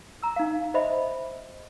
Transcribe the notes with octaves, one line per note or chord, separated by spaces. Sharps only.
A#5 E6
D#4 F5
C5 D#5 E5 B5